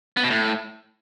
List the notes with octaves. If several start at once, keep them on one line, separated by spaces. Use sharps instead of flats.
B3
B2
A2